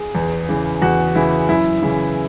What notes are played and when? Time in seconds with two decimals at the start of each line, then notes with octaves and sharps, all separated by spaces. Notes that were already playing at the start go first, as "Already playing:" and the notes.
Already playing: G#4
0.15 E2
0.49 C#3 E3
0.82 E2 F#4
1.15 C#3 E3 E4
1.49 F#2 E4
1.82 C#3 E3